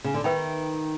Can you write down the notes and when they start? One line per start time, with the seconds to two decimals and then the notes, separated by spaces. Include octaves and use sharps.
0.04 C#3
0.14 D3
0.24 D#3 B4 E5 G5 B5